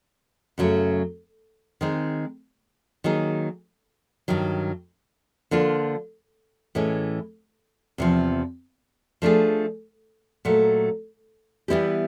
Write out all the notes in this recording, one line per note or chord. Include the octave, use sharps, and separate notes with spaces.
F#2 C#3 F#3 A3
D#3 G#3 C4 D#4
D#3 F#3 A#3 D#4 G#4
G2 D#3 F#3
D3 F3 A#3 D4 F4
A2 E3 G#3 C#4
E2 C3 F3
F3 A3 D4 F4 G#4
A#2 F#3 A3
E3 G3 B3 E4 G4